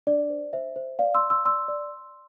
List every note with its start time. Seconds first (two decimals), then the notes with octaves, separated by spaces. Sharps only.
0.07 D4 D5
0.30 C5
0.53 C5 E5
0.76 C5
0.99 D5 F5
1.15 C6 E6
1.23 D5
1.30 C6 E6
1.45 D5 C6 E6
1.68 D5